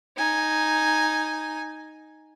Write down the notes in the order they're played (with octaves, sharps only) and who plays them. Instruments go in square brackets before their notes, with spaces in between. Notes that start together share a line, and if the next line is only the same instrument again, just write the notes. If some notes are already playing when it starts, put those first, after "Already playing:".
[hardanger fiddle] D#4 G#5